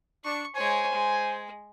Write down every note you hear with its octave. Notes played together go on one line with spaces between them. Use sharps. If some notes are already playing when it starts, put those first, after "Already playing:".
D4 C#6
G#3 C5 C#5 G#5
G#3